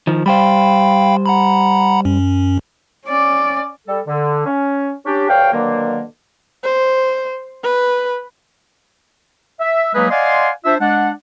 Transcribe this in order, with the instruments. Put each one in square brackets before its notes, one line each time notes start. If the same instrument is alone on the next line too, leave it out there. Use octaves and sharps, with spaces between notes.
[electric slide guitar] D#3 F3
[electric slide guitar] G3 C5 [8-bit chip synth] F5 G5 B5
[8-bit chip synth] F#5 A#5 B5
F#2 C#4
[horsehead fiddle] C#4 D5
[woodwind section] G3 A4
D3
C#4
C#4 D4 G4
D2 G2 C#5 F5 G5
B2 D3 D#3 F#3 A#3
[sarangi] C5
B4
[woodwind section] E5
F#3 G#3 A#3 D#4 G#4 B4
D5 D#5 F5 F#5 G#5 C6
D4 F4 C5 E5
G#3 D4 F#5